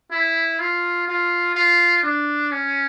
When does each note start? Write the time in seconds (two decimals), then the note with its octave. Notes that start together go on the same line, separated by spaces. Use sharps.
0.12 E4
0.59 F4
1.08 F4
1.55 F4
2.03 D4
2.52 C#4